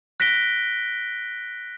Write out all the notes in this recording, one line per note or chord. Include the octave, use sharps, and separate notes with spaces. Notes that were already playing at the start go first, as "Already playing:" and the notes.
F#6 A#6 B6 D7 G7